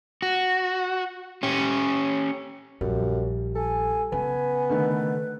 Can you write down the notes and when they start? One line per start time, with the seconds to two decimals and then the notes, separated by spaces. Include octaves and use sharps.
0.22 F#4
1.43 C#4 G4
2.81 A#1 F#2 G3
3.55 A4 G#5
4.12 C#3 B3 G#5
4.70 D3 D#3 A3 B4